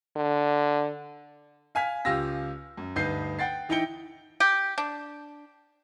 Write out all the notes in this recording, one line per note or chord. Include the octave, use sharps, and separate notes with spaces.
D3
F5 G#5 F6 B6
C#2 F4 G4 E6 A#6
F#2
D2 G2 D#4 B4 G6 C7
F#5 G5 A6 C7
E3 D#4 E4 G5 C#7 G7
G4
D4